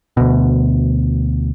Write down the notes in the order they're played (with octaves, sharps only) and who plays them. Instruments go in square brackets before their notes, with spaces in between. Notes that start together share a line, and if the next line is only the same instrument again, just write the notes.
[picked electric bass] D2 B2